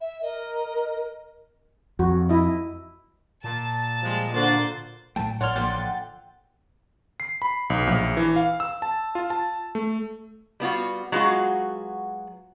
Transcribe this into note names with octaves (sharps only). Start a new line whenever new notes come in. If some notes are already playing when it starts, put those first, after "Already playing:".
E5
A#4 D#5
F2 F#4
E4 D#5
A#2 A5
F3 G3 G#3
D3 A#3 F4 F#4 C5 D5 A6
A2 F#3 A3 G5 A5
A1 A2 C#5 D5 F#5 C6 F6
D3 F3 A#3 F#5 G5 A6
C7
B5
B1
A#1
E3
F5
E6
A5
F4
A5
A3
G3 B3 F4 F#4
F#3 G#3 B3 F4 F#4